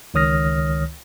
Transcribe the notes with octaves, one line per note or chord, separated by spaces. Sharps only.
C#2 D#3 C#5 D#6 F6 A#6